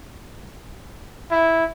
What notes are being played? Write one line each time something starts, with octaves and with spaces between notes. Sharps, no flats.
E4